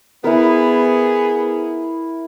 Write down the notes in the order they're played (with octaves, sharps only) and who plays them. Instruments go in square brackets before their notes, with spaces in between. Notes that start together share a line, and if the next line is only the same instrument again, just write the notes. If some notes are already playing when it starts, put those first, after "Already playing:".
[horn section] B3 G#4 [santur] E4 A#4